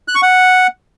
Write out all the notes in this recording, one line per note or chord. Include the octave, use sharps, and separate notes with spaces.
F#6
C#6
F#5